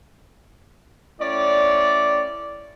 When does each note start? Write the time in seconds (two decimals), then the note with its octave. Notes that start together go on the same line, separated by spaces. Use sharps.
1.20 A2 C#4 D5